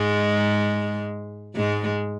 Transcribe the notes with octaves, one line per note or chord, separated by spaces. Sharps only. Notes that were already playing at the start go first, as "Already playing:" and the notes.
Already playing: G#2 G#3
G#2 G#3